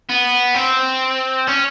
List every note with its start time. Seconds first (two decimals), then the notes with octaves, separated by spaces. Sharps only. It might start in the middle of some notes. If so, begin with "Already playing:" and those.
0.09 B3
0.54 C4
1.47 C#4